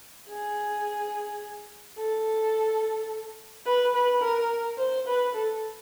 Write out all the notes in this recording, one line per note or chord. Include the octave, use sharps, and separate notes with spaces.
G#4
A4
B4
B4
A#4
C5
B4
A4